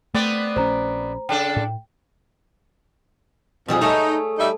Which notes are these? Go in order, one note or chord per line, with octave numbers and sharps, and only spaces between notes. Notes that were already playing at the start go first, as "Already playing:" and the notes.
A3 B3 C4 D5
A#1 C#4 C5 A#5
C#3 D4 A4 G5
A2
F2 B2 G3 G#4
A3 D#4 G#4 C#5
G3 D#4 E5